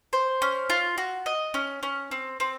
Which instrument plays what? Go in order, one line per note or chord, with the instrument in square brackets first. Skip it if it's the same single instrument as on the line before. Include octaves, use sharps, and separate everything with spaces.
[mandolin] C5
C#4
F4
F#4
D#5
C#4
C#4
C4
C4